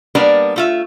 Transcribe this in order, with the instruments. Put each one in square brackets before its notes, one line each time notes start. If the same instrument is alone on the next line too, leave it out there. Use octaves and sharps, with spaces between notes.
[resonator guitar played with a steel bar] G3 A#3 B3 D4 A#4
A3 F4 E5